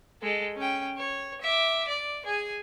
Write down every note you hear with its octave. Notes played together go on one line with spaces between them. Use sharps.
G#3 A4
C#4 G5
C#5
E5 D6
D5
G#4 G#5